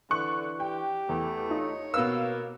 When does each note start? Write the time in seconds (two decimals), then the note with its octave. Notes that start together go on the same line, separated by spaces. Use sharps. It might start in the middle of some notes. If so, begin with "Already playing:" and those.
0.11 D3 E3 C#6 F#6 C#7
0.60 G4 G5
1.09 E2 A3
1.50 D#4 F4 C#5
1.94 B2 A#3 B4 F5 E6